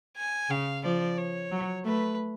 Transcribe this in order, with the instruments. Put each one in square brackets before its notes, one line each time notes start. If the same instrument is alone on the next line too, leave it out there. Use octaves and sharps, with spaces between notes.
[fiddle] G#5
[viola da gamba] C#3 [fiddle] F5
[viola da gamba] F3 [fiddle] D5
[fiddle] C#5
[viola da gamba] F#3
[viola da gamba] A3 [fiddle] B4